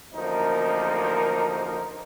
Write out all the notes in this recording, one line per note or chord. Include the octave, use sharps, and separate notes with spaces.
A1 D2 F3 A#3 D#4 A#4